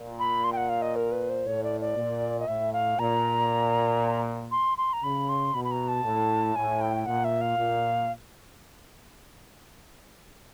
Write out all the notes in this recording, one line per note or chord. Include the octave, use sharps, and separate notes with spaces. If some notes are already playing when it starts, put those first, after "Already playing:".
Already playing: A#2
B5
C6
G5
F#5
F5
D#5
A#4
B4
C5
A2 C#5
D5
D5
A#2
D#5
A2 E5
F5
A#2 A#5
C6
C6
A#5
C#3 B5
C6
B2 B5
B5
A#5
A5
A2
A2 G#5
G5
A#2 F#5
E5
F5
A#2